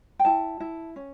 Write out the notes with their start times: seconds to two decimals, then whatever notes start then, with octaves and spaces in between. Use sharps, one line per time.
0.19 G5
0.25 E4 A5
0.60 E4
0.96 C#4